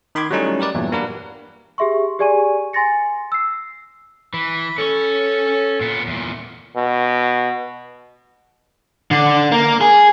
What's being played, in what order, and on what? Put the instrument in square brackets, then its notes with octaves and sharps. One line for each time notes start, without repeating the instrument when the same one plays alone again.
[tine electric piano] D#3 B5 C6 D6 G#6
F#3 G3 A3 C#4 D#4 E4
G4 A#4 B4 D5
E2 G2 A#2 F#3
A#3 D4 F#4 G4 A#4 B4
[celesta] G4 G#4 E5 C6 C#6
G4 G#4 D5 G#5 C#6 D#7
G#5 C6 A6 A#6 C#7
E6 C7
[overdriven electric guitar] E3 [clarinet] B5
[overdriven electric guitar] C#4 C#5 [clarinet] A4
[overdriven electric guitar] A#2 B3
E2 A#2
[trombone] B2
[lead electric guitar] D3
A#3
G#4